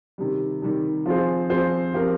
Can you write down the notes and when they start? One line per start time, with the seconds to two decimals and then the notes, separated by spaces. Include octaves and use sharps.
0.18 C3 D#3 G3
0.62 C3 D#3 G3
1.06 F3 C4 F4 G#4 C5
1.50 F3 C4 F4 G#4 C5
1.94 F3 C4 G4 A#4